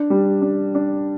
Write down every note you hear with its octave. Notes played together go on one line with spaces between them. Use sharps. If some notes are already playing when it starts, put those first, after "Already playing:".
Already playing: D4
G3
D4
D4